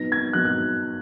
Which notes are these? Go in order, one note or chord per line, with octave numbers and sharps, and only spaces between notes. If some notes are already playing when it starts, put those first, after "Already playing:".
Already playing: F#3 B3 D#4 A#6
G#6
F#3 B3 D#4 F#6
F#6